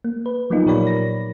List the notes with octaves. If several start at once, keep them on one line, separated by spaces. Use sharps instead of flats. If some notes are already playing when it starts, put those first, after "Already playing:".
A#3
B4
F3 F#3 A#3 B3 D#4 F4
A#2 G4 A#4 C#5 D5 B5
A#6